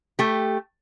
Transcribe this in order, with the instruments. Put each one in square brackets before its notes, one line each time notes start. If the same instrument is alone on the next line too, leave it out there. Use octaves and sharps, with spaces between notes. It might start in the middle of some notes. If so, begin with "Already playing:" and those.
[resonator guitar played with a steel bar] A3 G4